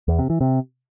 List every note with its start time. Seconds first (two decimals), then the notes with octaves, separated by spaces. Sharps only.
0.08 E2
0.19 C3
0.30 E3
0.41 C3